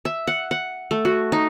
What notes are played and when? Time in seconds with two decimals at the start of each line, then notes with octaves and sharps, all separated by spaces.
0.05 E5
0.27 F#5
0.51 F#5
0.91 A3
1.05 F#4
1.32 D#4